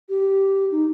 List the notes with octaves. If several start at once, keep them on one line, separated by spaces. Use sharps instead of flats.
G4
D#4